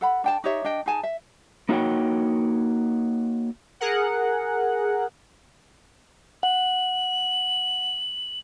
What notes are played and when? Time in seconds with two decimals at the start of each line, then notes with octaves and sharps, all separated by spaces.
0.01 A4 F#5 B5
0.24 D4 G5 A5
0.44 D#4 G4 C#5 E5
0.64 D4 D#5 G5
0.86 D#4 G#4 G#5 A5
1.03 E5
1.69 A#3 D#4 F#4 G#4 C#5 G5
3.80 G#4 A#4 F#5
6.43 F#5 F#7